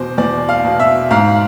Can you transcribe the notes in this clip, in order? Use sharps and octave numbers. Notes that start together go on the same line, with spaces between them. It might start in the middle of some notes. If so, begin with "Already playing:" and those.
Already playing: E2 B2 C5
E2 D5
F5
B2
E5
G#2 F5